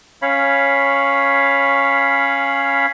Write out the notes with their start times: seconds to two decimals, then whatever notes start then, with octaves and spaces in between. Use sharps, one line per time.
0.22 C#4 C#5 F5 B5